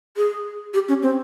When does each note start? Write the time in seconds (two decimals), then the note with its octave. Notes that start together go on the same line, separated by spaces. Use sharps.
0.17 G#4
0.74 G4
0.89 C#4
1.03 C4